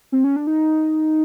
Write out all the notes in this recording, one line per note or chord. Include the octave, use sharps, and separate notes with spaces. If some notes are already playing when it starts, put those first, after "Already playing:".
C4
C#4
D4
D#4